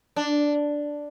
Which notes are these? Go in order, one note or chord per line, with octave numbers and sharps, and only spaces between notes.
D4